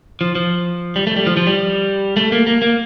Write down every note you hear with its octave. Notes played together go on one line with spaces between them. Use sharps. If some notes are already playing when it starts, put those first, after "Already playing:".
F3
F3
G3
A3
G3
F3
F3
G3
A3
A#3
A#3
A#3